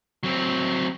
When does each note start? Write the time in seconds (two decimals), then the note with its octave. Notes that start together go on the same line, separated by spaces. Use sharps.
0.23 F#3 C4